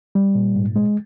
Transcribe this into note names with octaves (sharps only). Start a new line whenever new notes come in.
G3
A#2
G#2
G#3